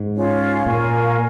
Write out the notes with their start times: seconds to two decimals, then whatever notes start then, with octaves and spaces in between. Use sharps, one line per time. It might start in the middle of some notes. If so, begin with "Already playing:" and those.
Already playing: G#2
0.16 C#4 F4 C#5
0.66 A#2 A#4 F5 G#5 C#6